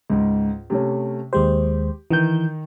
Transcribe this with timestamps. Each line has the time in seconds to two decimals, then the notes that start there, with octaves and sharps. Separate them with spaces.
0.10 C#2 G#2
0.70 C3 A3 C#4
1.33 D#2 G#3 G4 C5
2.10 D#3 E3 D#4 G6